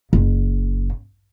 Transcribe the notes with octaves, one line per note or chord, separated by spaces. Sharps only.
F#1